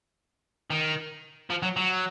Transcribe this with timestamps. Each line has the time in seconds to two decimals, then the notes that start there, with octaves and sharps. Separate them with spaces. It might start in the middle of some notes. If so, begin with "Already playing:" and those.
0.70 D#3
1.50 F3
1.63 F#3
1.76 F#3